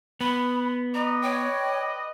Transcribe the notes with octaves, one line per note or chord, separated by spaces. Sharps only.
B3 B5
B4 D5 D#5 A#5
C#5 G5